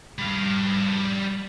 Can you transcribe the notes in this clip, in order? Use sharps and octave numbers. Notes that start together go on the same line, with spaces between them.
G3 F5